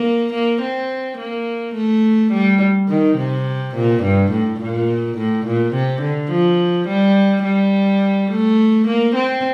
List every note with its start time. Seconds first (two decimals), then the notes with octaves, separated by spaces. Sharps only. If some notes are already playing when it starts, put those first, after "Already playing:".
Already playing: A#3
0.33 A#3
0.61 C4
1.18 A#3
1.74 A3
2.32 G3
2.89 D#3
3.17 C3
3.75 A#2
4.03 G2
4.31 A2
4.60 A#2
5.17 A2
5.46 A#2
5.74 C3
6.02 D3
6.31 F3
6.88 G3
7.44 G3
8.31 A3
8.88 A#3
9.15 C4